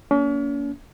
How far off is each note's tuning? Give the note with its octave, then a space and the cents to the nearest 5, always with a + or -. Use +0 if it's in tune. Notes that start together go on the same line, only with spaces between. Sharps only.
A#3 +0 C#4 +40